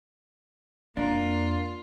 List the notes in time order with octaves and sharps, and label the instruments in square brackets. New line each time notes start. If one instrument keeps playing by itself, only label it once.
[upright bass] F2 G#3 [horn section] A#3 [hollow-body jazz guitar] D4 A#4 [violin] F4